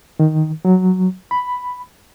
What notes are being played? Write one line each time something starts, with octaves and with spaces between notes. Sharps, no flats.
D#3
F#3
B5